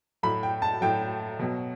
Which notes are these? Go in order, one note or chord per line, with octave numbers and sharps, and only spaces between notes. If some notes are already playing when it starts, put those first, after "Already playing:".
A2 F#3 B5
G5
A5
A2 F#3 G5
B2 F#3